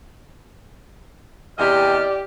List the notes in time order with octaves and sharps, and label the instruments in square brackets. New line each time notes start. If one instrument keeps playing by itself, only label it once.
[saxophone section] E2 C3 D#5 [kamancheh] G4 [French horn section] D5 [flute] F6